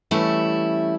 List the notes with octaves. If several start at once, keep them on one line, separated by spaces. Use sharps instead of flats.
E3 G3 A3 C#4 E4